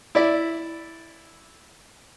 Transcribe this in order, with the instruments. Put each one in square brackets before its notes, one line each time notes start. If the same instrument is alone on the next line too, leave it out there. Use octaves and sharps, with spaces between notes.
[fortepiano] E4 D5 E5